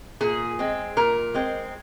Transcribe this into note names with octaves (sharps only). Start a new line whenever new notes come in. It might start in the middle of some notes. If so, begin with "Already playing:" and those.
A#2 G#4
G#3 C4
A#2 A#4
G#3 C4